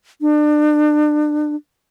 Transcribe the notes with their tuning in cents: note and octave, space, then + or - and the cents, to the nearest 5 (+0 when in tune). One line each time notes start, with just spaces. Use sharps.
D4 +30